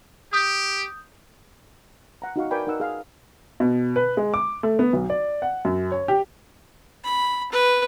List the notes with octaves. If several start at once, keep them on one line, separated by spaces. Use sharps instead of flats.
G4 D#6 G6
F#5 A#5
D#4 F#4 F5 C#6
A#4 B4 D5 G5 G#5 B5
D#4 A#4 F#5 E6
G#4 F5
B2
B4
G#3
D6
A3
B3
B1
D5
F#5
F#2
C#5
G4
B5
B4